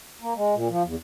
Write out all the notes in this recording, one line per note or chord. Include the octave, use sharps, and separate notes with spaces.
A#3
G#3
A#2
F3
E2